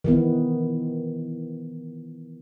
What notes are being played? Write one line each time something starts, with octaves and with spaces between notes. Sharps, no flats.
D#3 E3 B3